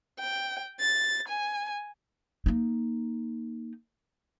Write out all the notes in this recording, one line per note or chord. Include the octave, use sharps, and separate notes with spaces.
G5
A6
G#5
A#3 D#4